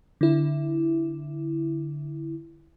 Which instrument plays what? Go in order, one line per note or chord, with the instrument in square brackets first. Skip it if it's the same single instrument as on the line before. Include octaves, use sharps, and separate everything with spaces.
[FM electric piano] D3 E4